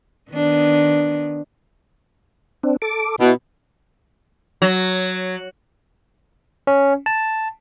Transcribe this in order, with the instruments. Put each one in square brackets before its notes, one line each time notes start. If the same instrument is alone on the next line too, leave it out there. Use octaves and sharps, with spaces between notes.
[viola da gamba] D#3 B3 D4
[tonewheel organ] C4 D4
A4 D6
[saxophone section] B2 [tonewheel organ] E4
[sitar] F#3
[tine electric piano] C#4
A5